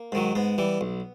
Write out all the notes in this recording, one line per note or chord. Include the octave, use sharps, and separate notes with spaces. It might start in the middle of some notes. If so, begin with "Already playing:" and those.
Already playing: A#3
G#2 D#3 F#3
G#2 B3
E3 G3
B1